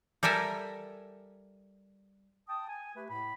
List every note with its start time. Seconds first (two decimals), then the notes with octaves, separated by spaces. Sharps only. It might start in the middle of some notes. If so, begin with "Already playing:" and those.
0.23 G3 A4 A#4 E5 G#5
2.48 G5 A5 D#6
2.69 G#5
2.96 A3 G4 B4
3.09 A2 B5